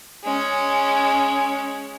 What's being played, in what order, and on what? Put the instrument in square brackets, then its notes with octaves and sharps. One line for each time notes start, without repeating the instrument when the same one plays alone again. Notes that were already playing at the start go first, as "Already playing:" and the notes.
[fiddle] G#3 C#4